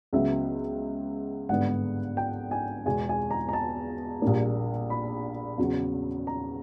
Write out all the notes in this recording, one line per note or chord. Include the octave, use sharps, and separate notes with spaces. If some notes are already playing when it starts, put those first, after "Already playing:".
C#2 C#3 F#3 B3 E5
G#1 G2 D3 G3 B3 F#5
G5
G#5
E2 B2 G#3 G#5
G#5
A#5
A#5
A5
A#1 A#2 G3 A#3
B5
E2 C#3 F#3
A#5